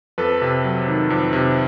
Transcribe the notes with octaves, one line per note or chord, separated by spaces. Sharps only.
F2 A4 B4
C3
F#3
D#3
F2
C3